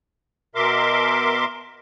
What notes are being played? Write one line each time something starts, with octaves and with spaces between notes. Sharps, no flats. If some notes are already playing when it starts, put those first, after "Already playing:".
B2 A#4 E5 C6 D6